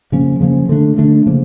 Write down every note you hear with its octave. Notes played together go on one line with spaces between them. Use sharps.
C#3 F3 A#3 C#4
C#3 F3 A#3 C#4
D3 A3 D4
D3 A3 D4
C#3 F3 A#3